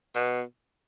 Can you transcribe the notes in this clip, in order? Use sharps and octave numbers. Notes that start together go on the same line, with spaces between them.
B2